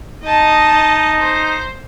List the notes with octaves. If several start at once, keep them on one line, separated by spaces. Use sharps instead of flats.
D#4 D#5 A5
C5